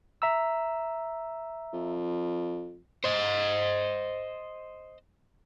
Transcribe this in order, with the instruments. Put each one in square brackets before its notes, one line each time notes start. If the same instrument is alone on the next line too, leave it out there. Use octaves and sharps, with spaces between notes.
[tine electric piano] E5 A#5 E6
[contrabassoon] F2
[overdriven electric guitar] C5 D#5